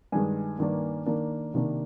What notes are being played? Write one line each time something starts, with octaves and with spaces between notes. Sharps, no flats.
G2 D#3 G#3 G#5
G2 D#3 A#3 D4
D#3 A#3 D4
C3 D#3 A#3 D4